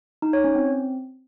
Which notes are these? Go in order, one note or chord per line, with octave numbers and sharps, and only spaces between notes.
D#4
C#5
C#4
C4